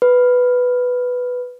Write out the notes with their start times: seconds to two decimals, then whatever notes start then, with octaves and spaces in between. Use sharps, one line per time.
0.02 B4